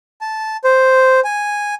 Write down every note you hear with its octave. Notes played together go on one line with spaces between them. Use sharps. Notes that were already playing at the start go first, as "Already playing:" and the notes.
A5
C5
G#5